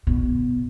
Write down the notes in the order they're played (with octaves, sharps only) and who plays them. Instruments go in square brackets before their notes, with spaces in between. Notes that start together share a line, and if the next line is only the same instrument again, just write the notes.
[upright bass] B2